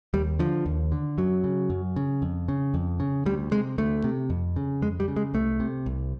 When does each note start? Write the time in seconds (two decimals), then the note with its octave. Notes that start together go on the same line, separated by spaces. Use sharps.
0.14 D#2 G3
0.39 D3 F3
0.66 D#2
0.92 D3
1.18 F#2 F#3
1.44 C#3
1.70 F#2
1.96 C#3
2.22 F2
2.48 C#3
2.74 F2
3.00 C#3
3.26 D2 G3
3.51 C3 G#3
3.78 D2 A3
4.04 C3
4.30 F2
4.56 C#3
4.82 F2 G#3
5.00 G3
5.08 C#3
5.16 G#3
5.34 C2 A3
5.60 C3
5.86 C2